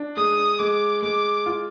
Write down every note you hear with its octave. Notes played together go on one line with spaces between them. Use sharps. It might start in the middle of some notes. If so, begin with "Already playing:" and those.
Already playing: D4
G#3 D#6
G#3 D6
G#3 D6
F4